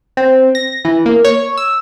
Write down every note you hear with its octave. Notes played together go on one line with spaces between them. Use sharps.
C4
A#6
E3
A#3
C#5
E6